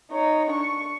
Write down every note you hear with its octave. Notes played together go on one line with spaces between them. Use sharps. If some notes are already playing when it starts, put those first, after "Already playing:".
D#4 C#5
D4 C#6